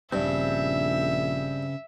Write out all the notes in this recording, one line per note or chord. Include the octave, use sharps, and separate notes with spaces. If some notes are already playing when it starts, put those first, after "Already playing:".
A#1 G2 C#3 C4 E5